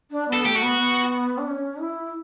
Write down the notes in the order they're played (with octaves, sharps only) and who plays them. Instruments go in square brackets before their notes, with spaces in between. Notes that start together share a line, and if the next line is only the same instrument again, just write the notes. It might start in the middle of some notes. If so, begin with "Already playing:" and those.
[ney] D4
B3
[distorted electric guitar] A4
[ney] A3 [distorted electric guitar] G4
[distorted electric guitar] F#4
[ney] B3
B3
D4
C#4
E4